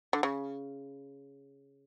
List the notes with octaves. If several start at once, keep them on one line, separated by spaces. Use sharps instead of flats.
D3
C#3